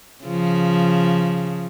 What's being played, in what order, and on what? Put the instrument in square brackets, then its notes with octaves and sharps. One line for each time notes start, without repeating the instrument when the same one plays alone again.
[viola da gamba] C#3 F3